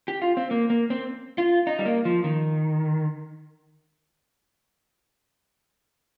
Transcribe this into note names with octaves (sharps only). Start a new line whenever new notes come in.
G4
F4
C4
A#3
A#3
C4
F4
D#4
G3
A#3
F3
D#3